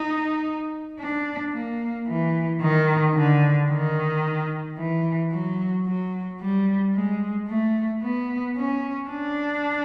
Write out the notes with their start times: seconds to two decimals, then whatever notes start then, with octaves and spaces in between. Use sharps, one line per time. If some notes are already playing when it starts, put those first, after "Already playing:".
Already playing: D#4
0.99 D4
1.53 A#3
2.08 E3
2.61 D#3
3.15 D3
3.69 D#3
4.78 E3
5.32 F#3
5.86 F#3
6.41 G3
6.95 G#3
7.48 A3
8.02 B3
8.56 C#4
9.10 D4